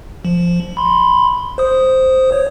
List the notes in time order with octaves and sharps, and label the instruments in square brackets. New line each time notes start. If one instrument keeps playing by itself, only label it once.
[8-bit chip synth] F3
B5 C6
C5 D#6
C#5